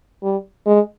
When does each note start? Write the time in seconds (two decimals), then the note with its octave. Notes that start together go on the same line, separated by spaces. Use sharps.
0.23 G3
0.66 G#3